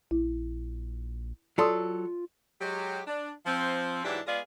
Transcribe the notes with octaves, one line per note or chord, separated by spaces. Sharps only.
A#1 E4
F#3 F4 A4 D5 C6 D#6
F#3 G#3 G4
D4
F3 C4
G#2 E3 F#3 D4 E4 G4
G#3 B3 F4 G#4 D5 F5